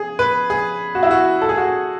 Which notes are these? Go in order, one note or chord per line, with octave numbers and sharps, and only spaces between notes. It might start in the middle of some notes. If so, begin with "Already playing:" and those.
Already playing: G#4
B4
G#4
F#4
E4
F#4
A4
G#4
F#4
G#4